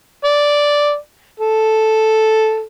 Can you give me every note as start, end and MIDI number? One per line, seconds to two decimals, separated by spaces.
0.24 0.96 74
1.39 2.65 69